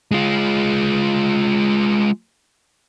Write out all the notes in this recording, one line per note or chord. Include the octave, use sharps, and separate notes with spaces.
G#3 F4